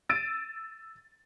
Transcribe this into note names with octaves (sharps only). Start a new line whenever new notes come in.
E6 A6 D7 D#7